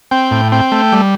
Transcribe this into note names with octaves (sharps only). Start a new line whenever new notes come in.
C4 G5
A2
C4 G5
A3
G3